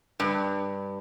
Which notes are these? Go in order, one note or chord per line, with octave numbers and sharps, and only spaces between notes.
G2